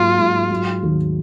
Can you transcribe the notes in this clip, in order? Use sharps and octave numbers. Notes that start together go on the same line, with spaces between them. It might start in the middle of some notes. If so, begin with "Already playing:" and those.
Already playing: G#2 F#3 A#3 F4
G#2
F#3
D#2